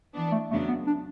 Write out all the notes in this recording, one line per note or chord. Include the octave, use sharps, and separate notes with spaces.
E3 B3 D4
A3
E2 C#3 F#3 A3 B3 D4
B3
D4